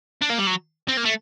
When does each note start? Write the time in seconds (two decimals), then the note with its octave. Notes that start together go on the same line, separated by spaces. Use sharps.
0.21 D4
0.30 A#3
0.38 G3
0.47 F#3
0.88 C4
0.97 A#3
1.05 A3